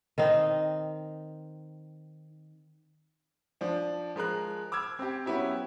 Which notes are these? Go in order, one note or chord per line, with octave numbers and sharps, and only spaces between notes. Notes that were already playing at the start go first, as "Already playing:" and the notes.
D#3 C4 D#4
F3 D4
F3 G#3 A#4 F#6
D6 E6 F6 G#6
C4 G4
F#3 B3 C#4 E4 G4